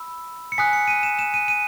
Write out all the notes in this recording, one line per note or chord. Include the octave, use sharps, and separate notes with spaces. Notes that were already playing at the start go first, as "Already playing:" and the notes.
Already playing: B5 E6
C#7
G#5 D#6 F#6 B6
C#7
D#7
E7
E7
D#7
D#7